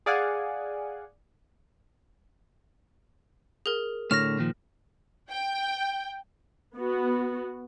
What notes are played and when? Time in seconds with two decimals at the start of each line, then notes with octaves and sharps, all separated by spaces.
0.06 G#4 D5 F5 F#5 G#5
3.66 G#4 A#4
4.11 A2 D3 C#5 F6 A#6
4.39 A#2 D#3 F3
5.30 G5
6.77 B3 F#4